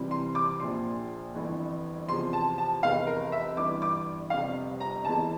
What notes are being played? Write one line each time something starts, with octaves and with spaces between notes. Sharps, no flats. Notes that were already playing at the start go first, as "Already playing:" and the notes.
Already playing: C2 C3 E3 G3
C6
D6
A#1 A#2 F3 C6
G1 F2 E3
E2 C3 F3 C6
A5
A5
F1 E2 C3 F5
A#4
E5
G1 G2 E3 D6
D6
G1 F2 C3 G3 F5
A#5
F1 E2 E3 A5